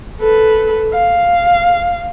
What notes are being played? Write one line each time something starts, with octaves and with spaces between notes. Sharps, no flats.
A4 B4
F5